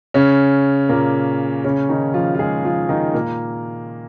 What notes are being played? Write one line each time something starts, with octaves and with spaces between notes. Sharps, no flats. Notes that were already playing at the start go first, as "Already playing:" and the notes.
C#3 C#4
A#2 A#3
C#3 C#4
D#3 D#4
F3 F4
F4
G#3 G#4
F3 F4
D#3 D#4
A#2 A#3